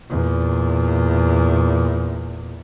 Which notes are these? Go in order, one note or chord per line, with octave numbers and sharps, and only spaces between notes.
E2 A#2